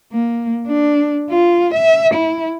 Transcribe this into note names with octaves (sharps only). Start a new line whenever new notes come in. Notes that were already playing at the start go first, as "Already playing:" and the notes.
A#3
D4
F4
E5
E4